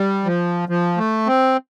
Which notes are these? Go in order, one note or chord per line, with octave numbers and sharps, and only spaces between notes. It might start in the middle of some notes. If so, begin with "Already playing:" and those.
Already playing: G3
F3
F3
A3
C4